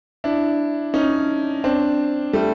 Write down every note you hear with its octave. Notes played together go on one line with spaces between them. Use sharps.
D4 E4
C#4 D#4
C4 D4
G3 A3